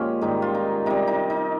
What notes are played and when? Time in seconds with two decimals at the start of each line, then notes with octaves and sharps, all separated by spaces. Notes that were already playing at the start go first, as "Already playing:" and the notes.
Already playing: A#2 F3 G#3 C#4 G4
0.21 G#2 D#3 G3 D#4
0.42 F4
0.54 D#4
0.86 C3 G3 D#4
1.07 D#4
1.30 D#4